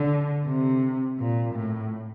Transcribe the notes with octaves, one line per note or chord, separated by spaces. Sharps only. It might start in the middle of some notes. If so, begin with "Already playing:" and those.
Already playing: D3
C3
A#2
A2